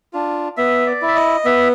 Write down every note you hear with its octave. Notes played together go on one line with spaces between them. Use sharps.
D4 F4
B3 E5
D5
E4
E5
D#5
B3 E5